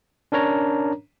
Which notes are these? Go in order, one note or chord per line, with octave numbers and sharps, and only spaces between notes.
C#4 D4 A#4 C#5 A#5